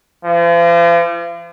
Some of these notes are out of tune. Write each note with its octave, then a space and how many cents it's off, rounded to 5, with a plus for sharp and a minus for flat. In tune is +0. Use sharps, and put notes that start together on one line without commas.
F3 -40